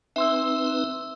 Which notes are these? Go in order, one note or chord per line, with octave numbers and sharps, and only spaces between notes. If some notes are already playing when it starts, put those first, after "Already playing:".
C4 D#4 B4 E5 C6 E6